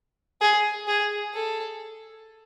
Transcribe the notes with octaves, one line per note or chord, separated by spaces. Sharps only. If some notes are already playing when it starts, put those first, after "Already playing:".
G#4
G#4
A4